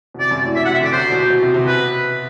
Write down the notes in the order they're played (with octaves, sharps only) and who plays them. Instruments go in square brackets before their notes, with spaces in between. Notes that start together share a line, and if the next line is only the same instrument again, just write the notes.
[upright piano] B2
[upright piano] C3 [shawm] D5
[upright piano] F#2
A2
[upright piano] B2 [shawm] E5
[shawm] F#5
[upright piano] C3
[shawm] E5
[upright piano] D3 [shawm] D5
[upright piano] F#3 [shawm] C5
[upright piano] B2
B2
C3
C3
[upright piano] B2 [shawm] B4